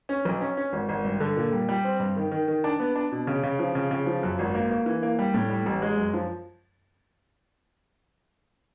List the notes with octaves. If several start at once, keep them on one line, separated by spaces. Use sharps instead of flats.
C#4
B1
C#4
C#4
G#1
G#1
G2
D3
A#2
G3
G3
C4
G2
D#3
D#3
D#3
D4
B3
D4
B2
C#3
C#3
F3
C#3
C#3
F3
F#2
G#1
A#3
A#3
E3
A#3
G3
A2
G3
A1
G#3
F#2
F3